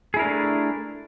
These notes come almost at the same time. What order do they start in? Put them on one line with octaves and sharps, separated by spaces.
G#4 E4 A#4 D4 A3